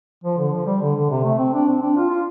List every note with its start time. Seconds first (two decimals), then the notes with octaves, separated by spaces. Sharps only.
0.24 F3
0.38 D3
0.53 F3
0.66 G3
0.82 D3
0.96 D3
1.11 C3
1.25 A3
1.39 C4
1.54 D4
1.68 C4
1.83 D4
1.97 F4
2.11 F4